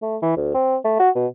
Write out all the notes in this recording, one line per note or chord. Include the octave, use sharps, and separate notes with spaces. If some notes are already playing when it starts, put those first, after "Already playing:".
A3
E3
D2
C4
A3
F#4
B2